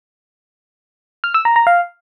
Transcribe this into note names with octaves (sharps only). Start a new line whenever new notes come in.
F6
E6
A#5
A#5
F5